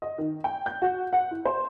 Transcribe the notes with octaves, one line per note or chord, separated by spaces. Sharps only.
D#5
D#3
G5
G6
F#4
F#5
E4
C5